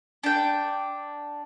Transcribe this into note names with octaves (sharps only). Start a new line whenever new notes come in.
D4 G5